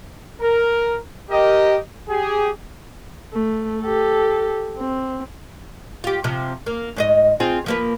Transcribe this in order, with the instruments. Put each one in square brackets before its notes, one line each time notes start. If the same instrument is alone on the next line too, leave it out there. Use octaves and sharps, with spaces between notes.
[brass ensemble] A#4
G4 A#4 D#5
G4 G#4
[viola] A3
G4 A4
C4
[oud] F4 G4
C3 F3
A#3
G#2 C5 D#5
C4 F4 G#4
F3 A#3 B4